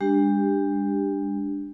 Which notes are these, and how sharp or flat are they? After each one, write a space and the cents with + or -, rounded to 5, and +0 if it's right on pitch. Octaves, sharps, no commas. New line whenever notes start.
G#3 -45 D4 +0 G4 +0